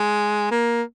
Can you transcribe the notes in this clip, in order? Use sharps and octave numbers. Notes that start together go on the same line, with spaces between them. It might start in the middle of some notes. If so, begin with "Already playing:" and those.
Already playing: G#3
A#3